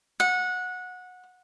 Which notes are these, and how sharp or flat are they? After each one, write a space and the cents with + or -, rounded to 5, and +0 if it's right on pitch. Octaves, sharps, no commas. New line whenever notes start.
F#5 -20